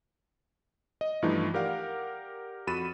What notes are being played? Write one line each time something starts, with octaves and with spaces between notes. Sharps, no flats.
D#5
G2 E3 F3 A3 D#4 E4
G4 A#4 D5 F5 F#5
F2 F#4 B5 A6 D#7 E7